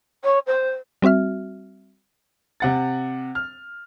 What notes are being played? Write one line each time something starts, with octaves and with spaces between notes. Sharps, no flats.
C#5
C5
G3 C4 F#4 E5 F6
C3 F#5 A6
F6